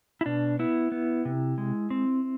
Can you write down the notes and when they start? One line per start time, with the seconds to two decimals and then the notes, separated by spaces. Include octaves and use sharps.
0.21 E4
0.26 B2 D4
0.59 B3 E4
0.92 B3
1.25 C3
1.58 G#3
1.91 C4